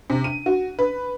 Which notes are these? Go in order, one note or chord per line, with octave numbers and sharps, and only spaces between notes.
C3
D#7
F#4
B4